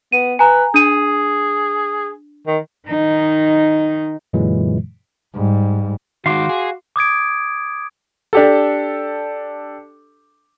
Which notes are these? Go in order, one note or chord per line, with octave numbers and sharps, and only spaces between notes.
B3 D#7
B4 G#5 A#5
D4 G#4 D#7
D#3
D#3 D#4
F#2 A#2 D3 E3 F#3 G#3
G#2 G3
D#3 G#3 F#4 F5 C6 D6
G#4
D6 D#6 G#6 D7
D4 G4 A4